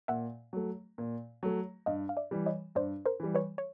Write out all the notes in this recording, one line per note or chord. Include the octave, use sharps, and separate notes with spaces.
A#2 E5 F#5
F#3 A3
A#2
F#3 A3
G2 D#5 F5
F5
D5 E5
E3 G3
C#5 D#5
G2 C5 D5
A#4 C5
E3 G3
B4 C#5
C#5